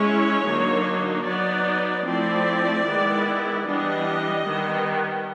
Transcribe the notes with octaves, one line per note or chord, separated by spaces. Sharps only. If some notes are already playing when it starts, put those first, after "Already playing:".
Already playing: G#3 C#4 E4 C#5
D3 F#3 A#3 D#4
F#3 B3 D#4 D5
F3 A3 C4 E4 D5
D#3 G#3 B3 E4
E3 G3 B3 D4 D#5
D#3 G3 B3